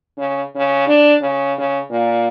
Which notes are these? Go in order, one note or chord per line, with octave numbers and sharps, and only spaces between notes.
C#3
C#3
D4
C#3
C#3
A#2